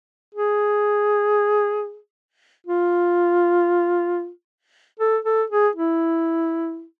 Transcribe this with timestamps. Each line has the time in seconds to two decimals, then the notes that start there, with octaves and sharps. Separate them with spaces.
0.35 G#4
2.67 F4
5.00 A4
5.25 A4
5.50 G#4
5.76 E4